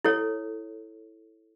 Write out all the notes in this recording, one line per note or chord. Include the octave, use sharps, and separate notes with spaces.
E4 A4 C#5